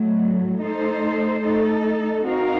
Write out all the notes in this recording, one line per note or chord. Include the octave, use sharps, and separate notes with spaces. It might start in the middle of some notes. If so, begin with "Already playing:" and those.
Already playing: A2 F#3 A3
A3 D#4 A4 C5
A3 D#4 A4
C4 D#4 F#4 A#4 F5